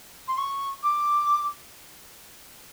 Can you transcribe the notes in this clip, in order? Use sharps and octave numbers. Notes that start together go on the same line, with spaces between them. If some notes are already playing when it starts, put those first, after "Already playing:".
C6
C#6
D6